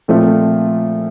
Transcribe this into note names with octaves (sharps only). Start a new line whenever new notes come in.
A#2 F3 A3 C4 F4